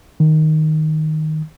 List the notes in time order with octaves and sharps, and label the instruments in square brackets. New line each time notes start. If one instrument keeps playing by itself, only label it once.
[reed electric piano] D#3